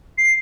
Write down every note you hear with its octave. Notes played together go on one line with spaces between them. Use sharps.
C7